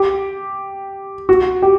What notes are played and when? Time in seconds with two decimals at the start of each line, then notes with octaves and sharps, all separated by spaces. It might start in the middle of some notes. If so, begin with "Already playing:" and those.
Already playing: G4
1.29 F#4
1.62 G4